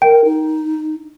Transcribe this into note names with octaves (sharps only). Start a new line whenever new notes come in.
A#4 G5
D#4